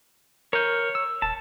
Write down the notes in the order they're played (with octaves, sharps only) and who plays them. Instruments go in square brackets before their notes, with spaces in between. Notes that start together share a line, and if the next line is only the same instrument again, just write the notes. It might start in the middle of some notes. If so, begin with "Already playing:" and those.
[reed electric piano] A#4 F6 G6 [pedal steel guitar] C#5
[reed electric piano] E6
[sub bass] D#1 [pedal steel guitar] A5